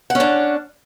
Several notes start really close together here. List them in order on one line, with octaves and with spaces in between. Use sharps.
F#5 C#4 D4